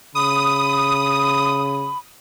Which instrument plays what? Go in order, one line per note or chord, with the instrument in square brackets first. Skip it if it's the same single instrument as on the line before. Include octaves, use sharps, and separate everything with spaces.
[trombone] C#3 [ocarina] B5 [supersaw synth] D#6